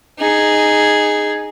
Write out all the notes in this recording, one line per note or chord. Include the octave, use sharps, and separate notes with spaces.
D#4 G#4